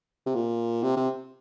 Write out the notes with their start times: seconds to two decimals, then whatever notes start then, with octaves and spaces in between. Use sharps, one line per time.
0.26 C3
0.35 A#2
0.83 C3
0.97 C3